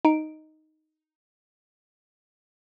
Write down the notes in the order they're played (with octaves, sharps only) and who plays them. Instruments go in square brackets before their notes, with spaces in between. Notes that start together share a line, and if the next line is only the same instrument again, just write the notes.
[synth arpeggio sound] D#4 D7